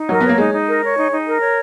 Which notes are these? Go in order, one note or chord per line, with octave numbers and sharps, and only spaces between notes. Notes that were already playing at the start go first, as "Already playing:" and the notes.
Already playing: D#4
F#3 A#4
B3 C#5
A#3
G#3 D#4
D#4
A#4
C#5
D#4
D#4
A#4
C#5